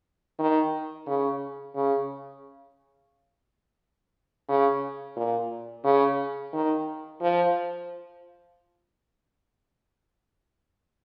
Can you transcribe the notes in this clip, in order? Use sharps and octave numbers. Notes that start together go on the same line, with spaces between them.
D#3
C#3
C#3
C#3
A#2
C#3
D#3
F3